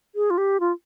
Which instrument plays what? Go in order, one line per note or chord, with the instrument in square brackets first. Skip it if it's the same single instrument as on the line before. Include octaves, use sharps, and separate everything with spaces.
[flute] G#4
F4
G4
F4